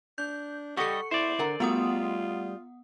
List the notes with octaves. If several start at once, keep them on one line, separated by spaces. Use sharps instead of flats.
D4 G6
G3 G4 A4 D#5 F#5 C#6 C#7
E4 C5 D5
D3 A#4 F#5 A#5
G3 A3 B3 F4 F#4 F#5 D#6